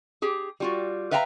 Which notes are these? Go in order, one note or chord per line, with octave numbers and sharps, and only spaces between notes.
G4 G#4
G3 F4 F#4
B4 E5 F5 G5 A5 A#5